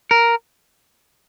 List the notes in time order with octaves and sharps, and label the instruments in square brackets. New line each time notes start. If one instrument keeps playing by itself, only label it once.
[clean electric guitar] A#4